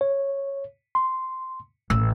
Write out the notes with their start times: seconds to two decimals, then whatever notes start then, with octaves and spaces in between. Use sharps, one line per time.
0.01 C#5
0.95 C6
1.90 A1 E6